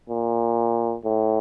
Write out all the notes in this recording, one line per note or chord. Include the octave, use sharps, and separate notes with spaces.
A#2
A2